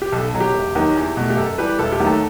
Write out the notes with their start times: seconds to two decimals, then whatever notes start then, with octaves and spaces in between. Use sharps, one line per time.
0.02 G4
0.12 B1 A4
0.34 B2 F#3
0.40 G4
0.54 E1
0.75 D#2 D#3 F#3
0.96 E2
1.17 B2 A3
1.30 G4
1.37 F#2 A4
1.58 E3 G3 G4 B4
1.79 E1 A4
1.92 G4
2.00 D#2 D#3 F#3 A3
2.07 A4